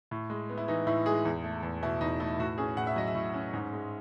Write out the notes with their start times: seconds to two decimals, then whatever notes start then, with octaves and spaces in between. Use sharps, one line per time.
0.11 A2
0.30 G#3
0.50 B3
0.58 E4
0.68 E3 D#4
0.87 A2 E4
1.06 G#3 G#4
1.25 E2
1.44 A3
1.63 E2
1.83 B2 E4
2.01 E2 D#4
2.20 A3 E4
2.39 A2 F#4
2.58 C#4 G#4
2.77 A2 F#5
2.87 E5
2.96 F#3 D#5
3.07 E5
3.15 A2
3.34 C#4
3.54 G#2
3.73 G#3